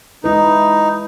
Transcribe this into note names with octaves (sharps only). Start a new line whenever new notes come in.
G#3 D#4 E4 B4